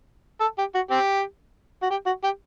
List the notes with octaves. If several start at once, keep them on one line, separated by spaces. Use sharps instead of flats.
A4
G4
F#4
C4 G4
F#4
G4
F#4
G4